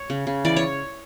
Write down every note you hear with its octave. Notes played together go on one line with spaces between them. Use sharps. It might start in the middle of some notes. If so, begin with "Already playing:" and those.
Already playing: C#5
C#3
C#3
E3 D5
C#5